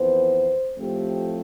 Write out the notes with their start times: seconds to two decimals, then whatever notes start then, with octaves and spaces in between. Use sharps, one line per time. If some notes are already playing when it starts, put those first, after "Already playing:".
Already playing: F2 E3 B3 C5
0.76 A2 F3 A3 C4 G4